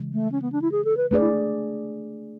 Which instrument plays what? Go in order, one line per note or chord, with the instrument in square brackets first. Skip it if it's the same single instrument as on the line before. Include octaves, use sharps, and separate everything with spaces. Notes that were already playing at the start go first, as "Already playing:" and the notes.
Already playing: [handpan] C#3 E3 G#3
[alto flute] A3
C#4
B3
D4
E4
G#4
A4
B4
[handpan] A3 D4 G#4 D5 [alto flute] B4
[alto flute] E4